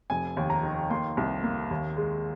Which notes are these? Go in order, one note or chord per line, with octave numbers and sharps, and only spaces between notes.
F1 G#5
D#2
A#5
D#3
A#3 C6
C2
A#3
D#2
G#3